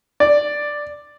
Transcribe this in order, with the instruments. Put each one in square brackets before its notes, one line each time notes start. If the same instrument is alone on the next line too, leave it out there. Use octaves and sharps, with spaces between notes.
[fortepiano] D5